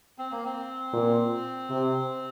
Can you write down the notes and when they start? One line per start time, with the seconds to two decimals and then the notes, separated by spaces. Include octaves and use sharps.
0.18 C4
0.31 A#3
0.45 C4
0.93 A#2
1.70 C3